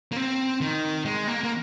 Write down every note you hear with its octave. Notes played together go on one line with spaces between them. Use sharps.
A#3
C4
D#3
G#3
A#3
A#3